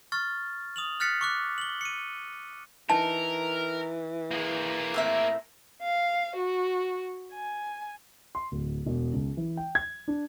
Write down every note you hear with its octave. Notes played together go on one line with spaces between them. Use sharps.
C#6 F6 A6
D#6 F7 F#7
F6 F#6 A6 B6 C#7
C#6 D6 F#6
F#7 G7
C#7 D#7
E3 D#4 A#4 A5
A#3 G#4
A2 C4 E5
F5
F#4
G#5
C6
D1
E1
C#2
E3
G5
G#6
D4